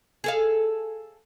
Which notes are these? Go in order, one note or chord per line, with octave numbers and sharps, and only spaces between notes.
G#4 A4 F5